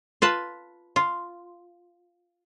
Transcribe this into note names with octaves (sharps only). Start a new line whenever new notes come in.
F4 B4 A5
F4